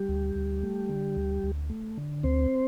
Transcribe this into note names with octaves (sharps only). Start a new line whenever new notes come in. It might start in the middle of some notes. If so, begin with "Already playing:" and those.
Already playing: G3 G4
D2
D2
A3
D3
D2
D2
A3
D3
D2 C4 C5